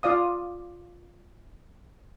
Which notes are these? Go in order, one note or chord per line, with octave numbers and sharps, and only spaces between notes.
F4 D5 F5 D#6